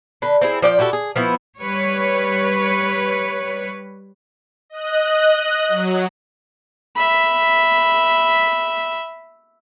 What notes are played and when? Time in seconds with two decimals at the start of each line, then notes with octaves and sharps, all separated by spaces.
0.22 D3 B4
0.41 C4 E4 G#4
0.62 F3 D5 G5
0.79 E4 F#4 G4 A4
0.93 G#4
1.16 F3 B3 E4 F#4
1.60 G3 B4 C#5
4.70 D#5 F#6
5.68 F#3
6.97 E5 B5